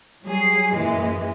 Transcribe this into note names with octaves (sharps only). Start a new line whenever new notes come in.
F#3 G3 G#4 C7
F#2 A#2 E3 G#3